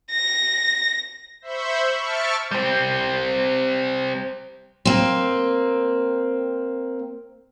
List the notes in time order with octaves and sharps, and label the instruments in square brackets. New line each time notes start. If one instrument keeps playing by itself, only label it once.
[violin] A#6
[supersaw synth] C5 E5 B5 C#6 G6
E5 A5 C#6 F6 D7
[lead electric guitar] G3 C4
[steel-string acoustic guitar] A#3 C4